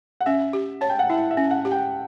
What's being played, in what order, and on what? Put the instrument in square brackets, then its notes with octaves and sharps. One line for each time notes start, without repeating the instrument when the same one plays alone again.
[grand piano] F#5
[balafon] C#4 [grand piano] E5
[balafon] G4
[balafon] C#5 [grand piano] A5
[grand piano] G5
F#5
[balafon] E4 [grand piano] E5
[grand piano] E5
[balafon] C#4
[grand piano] F#5
[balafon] G4
[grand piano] G5